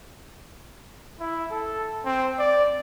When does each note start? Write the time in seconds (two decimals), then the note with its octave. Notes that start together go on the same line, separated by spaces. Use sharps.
1.20 E4
1.51 A4
2.05 C4
2.39 D5